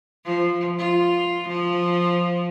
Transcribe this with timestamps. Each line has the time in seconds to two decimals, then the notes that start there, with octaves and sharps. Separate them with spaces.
0.25 F3
0.79 F4
1.48 F3